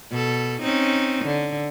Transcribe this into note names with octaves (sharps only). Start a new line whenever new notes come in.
B2 A4
C4 C#4 D#4
D3